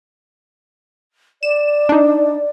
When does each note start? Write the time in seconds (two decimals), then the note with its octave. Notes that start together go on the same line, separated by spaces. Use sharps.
1.43 D5 E7
1.89 D4 D#4